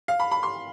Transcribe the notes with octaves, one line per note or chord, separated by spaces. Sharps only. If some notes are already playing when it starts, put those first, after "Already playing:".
F5
B5
B5
C6